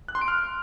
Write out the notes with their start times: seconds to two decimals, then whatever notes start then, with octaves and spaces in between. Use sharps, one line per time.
0.08 F#6
0.15 C6
0.21 D7
0.28 F6